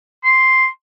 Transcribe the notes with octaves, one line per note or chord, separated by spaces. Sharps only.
C6